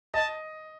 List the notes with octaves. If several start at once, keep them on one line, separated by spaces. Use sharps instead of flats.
D#5 A5